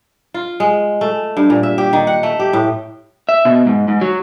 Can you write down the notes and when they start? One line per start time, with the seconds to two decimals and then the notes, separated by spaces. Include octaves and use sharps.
0.34 F4
0.60 G#3
1.01 A3
1.37 G2
1.50 A#2
1.63 E5
1.78 G4
1.93 D#3
2.07 F#5
2.23 A3
2.39 G4
2.53 A2
3.29 E5
3.45 B2
3.67 G#2
3.88 G#2
4.01 F#3